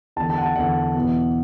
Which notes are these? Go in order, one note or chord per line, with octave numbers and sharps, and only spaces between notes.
E2 D3 A5
A5
F#5
A5
E2 D3 F#5
B2
E2